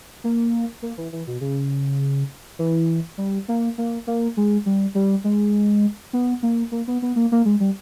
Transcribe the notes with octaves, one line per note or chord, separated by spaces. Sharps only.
A#3
A#3
E3
E3
B2
C#3
E3
G3
A#3
A#3
A#3
G#3
G3
G3
G#3
B3
A#3
A#3
B3
B3
A#3
A#3
G#3
G3